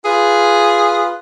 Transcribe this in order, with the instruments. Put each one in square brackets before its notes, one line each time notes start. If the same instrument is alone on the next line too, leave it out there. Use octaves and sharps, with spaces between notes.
[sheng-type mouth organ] F4 B4 [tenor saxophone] G#4